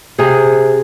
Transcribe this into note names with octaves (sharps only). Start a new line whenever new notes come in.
C3 G#4